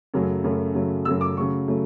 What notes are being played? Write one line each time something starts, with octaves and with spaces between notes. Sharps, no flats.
F#2 C#3 F#3 A3
F#2 C#3 F#3 A3
F#2 C#3 F#3 A3
F#2 C#3 F#3 A3 E6
D6
C#3 F#3 A3 C#6
C#3 F#3 A3